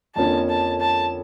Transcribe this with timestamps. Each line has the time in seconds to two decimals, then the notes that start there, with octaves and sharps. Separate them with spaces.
0.16 F2 D3 F3 A#3 C#4 A5
0.49 A5
0.80 A5